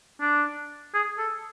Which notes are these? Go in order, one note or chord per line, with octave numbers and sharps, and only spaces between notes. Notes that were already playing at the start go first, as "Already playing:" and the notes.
D4
G#4
A4